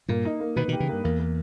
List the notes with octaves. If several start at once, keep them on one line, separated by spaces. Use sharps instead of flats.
G2 A#2 A#3
D#4
A#3
B2 D#3 B4
B2 D#3
G4
C#3 E3
G2 A#3
E2 A#3
A#3